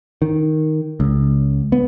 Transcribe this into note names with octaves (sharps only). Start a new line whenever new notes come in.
D#3
C#2
B3